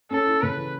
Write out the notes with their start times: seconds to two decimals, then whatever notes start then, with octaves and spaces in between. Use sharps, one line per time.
0.11 C#4 A4
0.26 E4
0.42 C#3 B4
0.57 E3